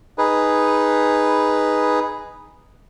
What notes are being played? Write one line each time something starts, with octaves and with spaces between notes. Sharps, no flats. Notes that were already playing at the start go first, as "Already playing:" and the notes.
D#4 G#4 B4